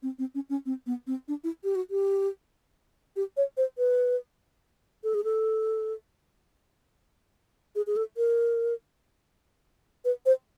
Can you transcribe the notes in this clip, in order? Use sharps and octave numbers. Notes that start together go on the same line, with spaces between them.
C4
C4
C#4
C#4
C4
B3
C4
D4
E4
G4
F#4
G4
G4
C#5
C5
B4
A4
G#4
A4
G#4
G#4
A4
A#4
B4
C5